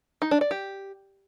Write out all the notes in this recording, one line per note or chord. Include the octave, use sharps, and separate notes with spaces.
D#4
D4
D5
G4